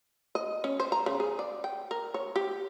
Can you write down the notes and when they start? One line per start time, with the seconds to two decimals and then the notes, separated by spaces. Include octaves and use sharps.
0.35 D#5
0.64 C#4
0.80 C5
0.92 A#5
1.06 C#3
1.20 G#4
1.39 D5
1.64 G5
1.91 A#4
2.14 C#5
2.36 G4